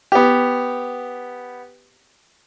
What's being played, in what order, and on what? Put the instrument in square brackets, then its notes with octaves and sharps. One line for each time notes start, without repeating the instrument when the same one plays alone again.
[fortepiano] B3 G4